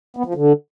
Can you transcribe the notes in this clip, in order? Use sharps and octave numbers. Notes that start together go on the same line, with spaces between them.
B3
F3
D3